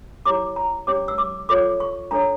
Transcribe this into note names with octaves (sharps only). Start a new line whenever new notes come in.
E4 G4 C#5 D6
A#5
C#4 G4 C#5 D6
E6
D6
F4 A4 C#5 D6
C#6
D4 A4 C#5 A#5